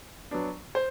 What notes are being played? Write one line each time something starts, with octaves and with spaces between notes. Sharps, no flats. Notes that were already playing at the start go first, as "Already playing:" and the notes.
F#3 B3 D4
C5